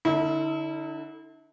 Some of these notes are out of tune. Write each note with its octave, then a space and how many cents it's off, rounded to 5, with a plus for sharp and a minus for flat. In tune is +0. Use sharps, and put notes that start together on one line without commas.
D3 +0 E4 -35 A4 +40